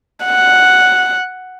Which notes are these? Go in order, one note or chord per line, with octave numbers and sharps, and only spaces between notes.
F#5